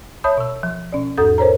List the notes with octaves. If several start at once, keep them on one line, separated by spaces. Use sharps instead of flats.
C#5 E5 A5 B5 D#6 G6
B2 E6
F3
B2 C#4 D5
E2 G#2 A4 D#6 G6 A6
A#4 C5 C#5 A#5